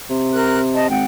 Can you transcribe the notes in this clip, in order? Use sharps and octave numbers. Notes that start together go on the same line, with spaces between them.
C3
A#4 F#6
D#5 A5
G#1 F#5 G5